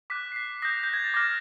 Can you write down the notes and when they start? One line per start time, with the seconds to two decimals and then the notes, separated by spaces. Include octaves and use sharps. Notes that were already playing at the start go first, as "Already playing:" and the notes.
0.10 D6 F#6 B6
0.32 C7
0.36 B6
0.62 D#6 G6 A#6
0.84 G6
0.93 G#6
1.04 A6
1.14 D6 F6 A#6